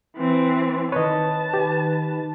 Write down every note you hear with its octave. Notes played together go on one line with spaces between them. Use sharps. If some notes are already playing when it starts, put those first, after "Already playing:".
E3 C4
D#3 B4 C#5 D#5 A5
G4